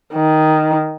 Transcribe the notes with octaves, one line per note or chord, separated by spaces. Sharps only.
D#3